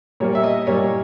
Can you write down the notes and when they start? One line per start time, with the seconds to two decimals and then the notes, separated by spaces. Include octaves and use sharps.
0.20 A#2 G3 A#3 C#5
0.35 E5
0.43 D#5
0.67 A#2 G3 A#3 C#5